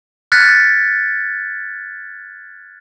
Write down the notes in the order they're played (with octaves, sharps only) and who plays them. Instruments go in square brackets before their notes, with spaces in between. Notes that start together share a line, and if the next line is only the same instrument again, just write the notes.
[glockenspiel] F6 F#6 G#6 A6 B6 C#7